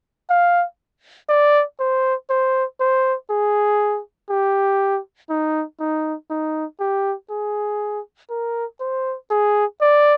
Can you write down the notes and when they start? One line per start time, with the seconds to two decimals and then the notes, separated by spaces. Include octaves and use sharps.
0.30 F5
1.29 D5
1.80 C5
2.30 C5
2.80 C5
3.30 G#4
4.30 G4
5.30 D#4
5.80 D#4
6.30 D#4
6.80 G4
7.30 G#4
8.30 A#4
8.80 C5
9.30 G#4
9.81 D5